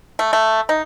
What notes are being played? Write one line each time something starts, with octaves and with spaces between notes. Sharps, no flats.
A3
A3
D#4